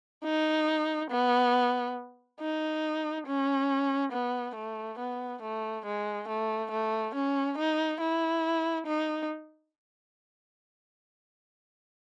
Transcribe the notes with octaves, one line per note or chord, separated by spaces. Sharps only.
D#4
B3
D#4
C#4
B3
A3
B3
A3
G#3
A3
A3
C#4
D#4
E4
D#4